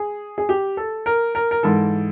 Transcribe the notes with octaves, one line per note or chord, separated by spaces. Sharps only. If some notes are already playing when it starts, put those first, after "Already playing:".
Already playing: G#4
G#4
G4
A4
A#4
A#4
A#4
G#2 E3 A4